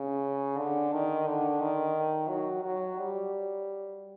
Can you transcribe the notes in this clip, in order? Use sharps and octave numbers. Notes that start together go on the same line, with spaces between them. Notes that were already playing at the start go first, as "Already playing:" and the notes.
Already playing: C#3
D3
D#3
D3
D#3
F#3
F#3
G3